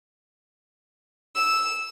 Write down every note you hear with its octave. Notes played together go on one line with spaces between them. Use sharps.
E6